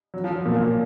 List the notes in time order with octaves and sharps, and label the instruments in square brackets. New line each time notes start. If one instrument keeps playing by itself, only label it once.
[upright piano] F#3
F3
F#3
A#2 A#3
A#2 A#3